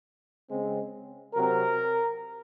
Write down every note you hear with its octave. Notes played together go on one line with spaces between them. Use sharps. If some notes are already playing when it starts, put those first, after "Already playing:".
C#3 G#3 C4
C3 F#3 C4 A#4